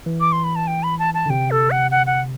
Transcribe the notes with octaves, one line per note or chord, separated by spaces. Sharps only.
E3
D6
C6
B5
A5
G5
B5
A5
A5
D3
C3 G5
A4
F#5
F#5
F#5